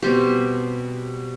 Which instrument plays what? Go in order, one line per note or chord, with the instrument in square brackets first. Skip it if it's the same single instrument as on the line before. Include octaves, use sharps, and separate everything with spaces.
[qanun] B2 G3 C4 G4